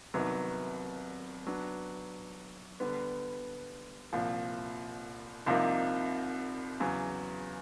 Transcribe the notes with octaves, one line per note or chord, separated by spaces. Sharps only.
C2 C3 D#3 F#3 B3
F#3 B3 D4
D3 G3 B3
C2 A#2 F3
C2 C3 F3 A#3 D#4
E2 C#3 F#3